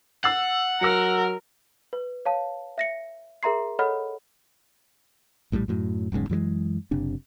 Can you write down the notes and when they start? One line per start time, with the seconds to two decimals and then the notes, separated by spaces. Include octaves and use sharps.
0.24 F#5 E6 A6 C7
0.81 F#3 A#4 E6 A#6 C#7
1.93 B4
2.25 C#5 F5 A5
2.78 E5 A#6 C#7
3.43 G#4 A#4 E5 A#5 C6 C7
3.79 A4 C#5 D#5 F#5 B5 F6
5.52 A#1 A2 C3 G3
5.68 F#2 A2 F#3
6.12 E1 B1 G#2 C#3
6.30 F#2 E3 F3 G#3
6.91 F#1 C3 D4